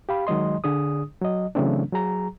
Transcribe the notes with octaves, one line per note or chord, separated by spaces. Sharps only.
G4 F5 B5
D#3 F#3 G#3 D#5 C6
D3 D4 G#4 D#6
F#3 D#5
C#3 E3 F#3 A3 C4 D4
F#3 G#4 A#5